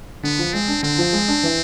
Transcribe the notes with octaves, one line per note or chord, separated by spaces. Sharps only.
D3 B3
F3
G#3 C4
D4
D3 C4
F3
G#3
D4
E3